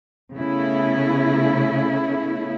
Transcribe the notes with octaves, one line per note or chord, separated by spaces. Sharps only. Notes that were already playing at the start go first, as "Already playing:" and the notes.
C#3 A3 B3 E4